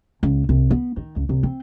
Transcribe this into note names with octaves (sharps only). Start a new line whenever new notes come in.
C#2
C2
B3
D#3
C#2
C2
C4